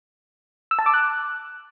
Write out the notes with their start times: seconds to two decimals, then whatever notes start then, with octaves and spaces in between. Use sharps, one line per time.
0.71 E6
0.79 A5
0.86 D6
0.94 F#6